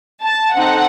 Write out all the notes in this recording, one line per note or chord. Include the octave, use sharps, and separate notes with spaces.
A5
C4 D#4 A4 F#5